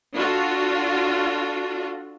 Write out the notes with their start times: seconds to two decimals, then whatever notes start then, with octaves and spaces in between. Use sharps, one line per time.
0.15 D4 F4 F#4 A4